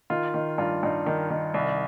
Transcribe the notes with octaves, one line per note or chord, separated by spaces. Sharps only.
D#3 F4
D#3
G2 F4
G2 D#4
D#3
D#3
C2